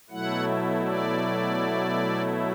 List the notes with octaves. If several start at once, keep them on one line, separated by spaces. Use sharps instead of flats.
B2 F#3 A3 E4 F#5
D5